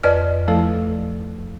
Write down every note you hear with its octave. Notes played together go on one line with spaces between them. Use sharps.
F2 B4 D5 D#5 F6
F3 A3 E4 A4